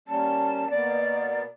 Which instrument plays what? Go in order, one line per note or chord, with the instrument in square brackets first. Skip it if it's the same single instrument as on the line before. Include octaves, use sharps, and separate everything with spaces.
[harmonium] G3 A#3 C#4 [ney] A5
[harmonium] B2 A#3 B3 [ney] D5